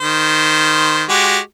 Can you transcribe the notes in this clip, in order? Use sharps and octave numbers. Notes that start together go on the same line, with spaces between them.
D#3 C5
G#3 F#4 G4